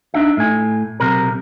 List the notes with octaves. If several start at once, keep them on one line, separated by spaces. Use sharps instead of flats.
D4 D#4 E5
A2 G#5
B1 C3 A#4